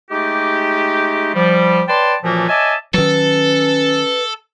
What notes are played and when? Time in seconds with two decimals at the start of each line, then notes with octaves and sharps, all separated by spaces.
0.11 G#3 A3 D#4 G4
1.34 F3 G3
1.88 B4 C#5 D5 G5 A5 C6
2.23 F#2 A#2 E3 F3 A3 A#3
2.49 C#5 D#5 E5 G#5 A5 D6
2.94 D#3 F#3 C#4 A4 B4